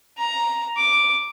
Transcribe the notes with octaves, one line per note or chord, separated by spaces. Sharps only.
A#5
D6